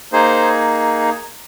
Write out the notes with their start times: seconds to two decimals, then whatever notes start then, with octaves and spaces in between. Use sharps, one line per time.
0.13 A#3 D#4 G#4 C5